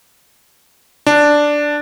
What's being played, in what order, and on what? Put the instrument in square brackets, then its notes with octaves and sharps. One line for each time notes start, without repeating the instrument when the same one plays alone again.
[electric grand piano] D4